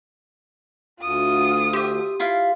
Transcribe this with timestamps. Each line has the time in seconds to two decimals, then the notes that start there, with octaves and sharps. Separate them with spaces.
1.00 D2 F4 D#6
1.73 G4 C5 E5
2.20 E4 F4 F5